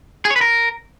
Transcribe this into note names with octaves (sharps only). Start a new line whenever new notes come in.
G#4
C#5
B4
A#4